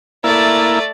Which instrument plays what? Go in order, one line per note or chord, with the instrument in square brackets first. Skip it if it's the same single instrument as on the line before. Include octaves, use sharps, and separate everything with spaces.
[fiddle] A3 D5 [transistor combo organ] A#3 E4